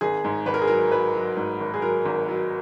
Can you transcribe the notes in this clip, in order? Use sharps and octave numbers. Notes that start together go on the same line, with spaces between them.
G#1 G#4
G#2
G#1 B4
A#4
G#4
F#3 A#4
F#3 B4
F#3
G#2
G#1
G#4
F#3 A#4
G#1
F#3